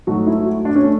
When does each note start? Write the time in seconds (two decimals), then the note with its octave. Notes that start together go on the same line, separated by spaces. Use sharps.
0.07 G#2 F#3 A3 F#4
0.27 E4
0.46 F#4
0.65 D4
0.76 C#4
0.84 A3